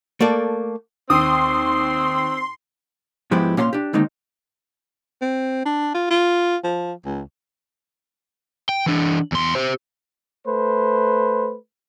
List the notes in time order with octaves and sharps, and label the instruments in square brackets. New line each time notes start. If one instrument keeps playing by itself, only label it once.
[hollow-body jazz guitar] A3 A#3 A4 D5
[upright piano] D#2 [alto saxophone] C4 [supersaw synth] C6 [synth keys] D#6
[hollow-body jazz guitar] G#2 F3 G#3 B3 E4 G4
A#2 C#4 F5 A#5 C6
D4 G4
D3 D#3 G#3 A#3 C4 D#4
[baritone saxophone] C4
D4
F4
F4
F3
C#2
[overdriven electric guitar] G5
E3 D4
E2 C6
G4 C5
[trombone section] A3 B4 C5